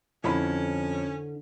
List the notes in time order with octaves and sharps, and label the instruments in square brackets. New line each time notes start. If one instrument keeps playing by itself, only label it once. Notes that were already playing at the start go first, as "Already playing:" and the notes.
[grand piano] F2 [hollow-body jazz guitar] D3 E4 B5 [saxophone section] C#4